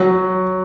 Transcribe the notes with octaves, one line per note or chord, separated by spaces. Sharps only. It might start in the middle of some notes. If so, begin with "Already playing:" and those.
Already playing: F#3